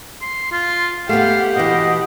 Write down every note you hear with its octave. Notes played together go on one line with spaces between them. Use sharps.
C6
F4
A3 B3 G4 F5 F#5
B2 E3 D#5